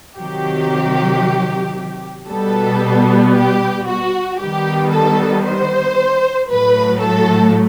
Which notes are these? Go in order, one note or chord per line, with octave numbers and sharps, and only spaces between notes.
C3 D#3 F#3 G4
B2 G3 B3 A4
G4
F#4
D#3 G3 B3 G4
A4
C5
A2 F#3 A3 B4
A4